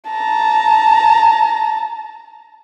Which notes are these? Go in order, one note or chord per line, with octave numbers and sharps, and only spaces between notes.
A5 A#5